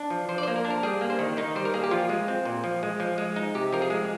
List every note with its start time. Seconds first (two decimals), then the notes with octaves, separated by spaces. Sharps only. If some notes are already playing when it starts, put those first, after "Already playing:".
Already playing: D4
0.10 F3
0.29 F3 C5
0.38 D5
0.43 C5
0.48 A#3
0.56 A#4
0.65 D4
0.70 A#4
0.83 G3 G#4
1.01 A#3
1.10 C5
1.19 D#3
1.37 D#3 D#4
1.56 G3 C5
1.65 A#4
1.74 A#3 G#4
1.84 G4
1.91 F3 F4
2.09 G#3
2.28 C4
2.45 A#2
2.64 F3
2.83 G#3
3.00 F3
3.18 G#3
3.36 D#4
3.55 C3 G4
3.73 F3 A#4
3.82 G#4
3.90 G#3